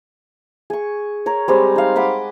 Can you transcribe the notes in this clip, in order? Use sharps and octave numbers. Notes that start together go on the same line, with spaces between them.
G#4 C#6
A#4 C#5
G3 G#3 C4 G4
D#4 F5
D#5 F#5 B5 D6